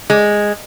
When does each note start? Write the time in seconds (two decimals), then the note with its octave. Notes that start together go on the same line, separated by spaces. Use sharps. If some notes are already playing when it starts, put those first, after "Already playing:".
0.10 G#3